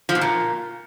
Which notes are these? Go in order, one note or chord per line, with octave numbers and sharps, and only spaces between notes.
F3
B2
A#2